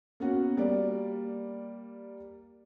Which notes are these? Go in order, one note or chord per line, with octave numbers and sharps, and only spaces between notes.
A#3 B3 C#4 F#4
G3 A#3 D5